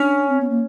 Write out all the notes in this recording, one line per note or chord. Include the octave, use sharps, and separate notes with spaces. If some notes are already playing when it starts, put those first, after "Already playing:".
Already playing: C#4 D4
C4
B3
A#3